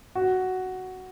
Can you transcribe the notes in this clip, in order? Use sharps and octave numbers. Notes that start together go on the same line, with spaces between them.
F#4